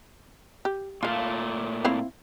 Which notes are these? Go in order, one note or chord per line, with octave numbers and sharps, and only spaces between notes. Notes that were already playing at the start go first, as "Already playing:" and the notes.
G4
A#2 A3 F4 F5
C4 E4 F5